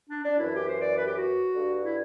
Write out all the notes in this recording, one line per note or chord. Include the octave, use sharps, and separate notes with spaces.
D4
D4
F#2 E3 E4
G4
C5
D5
B4
G4
F#4
G2 D3
E4